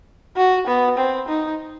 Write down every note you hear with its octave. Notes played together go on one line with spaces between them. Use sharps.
F#4
B3
C4
D#4